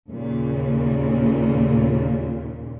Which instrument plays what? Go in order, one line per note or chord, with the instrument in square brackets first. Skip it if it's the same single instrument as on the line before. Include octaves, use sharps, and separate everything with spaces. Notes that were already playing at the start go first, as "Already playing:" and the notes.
[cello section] D#2 A#2 C#3